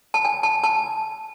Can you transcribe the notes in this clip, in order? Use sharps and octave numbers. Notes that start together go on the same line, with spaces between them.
A5
G#5
A5
A5